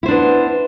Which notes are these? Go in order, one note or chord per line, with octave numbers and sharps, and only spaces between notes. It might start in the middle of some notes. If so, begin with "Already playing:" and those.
B3 D4 E4 C5